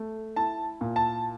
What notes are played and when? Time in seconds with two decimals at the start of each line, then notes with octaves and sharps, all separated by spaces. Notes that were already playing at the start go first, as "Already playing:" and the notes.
Already playing: A3
0.36 E4 A5
0.81 A#2
0.96 A5